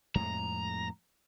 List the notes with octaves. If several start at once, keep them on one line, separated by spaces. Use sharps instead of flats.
F2 A2 G#3 A#5